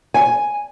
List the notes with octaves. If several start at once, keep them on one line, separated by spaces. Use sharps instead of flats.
G#5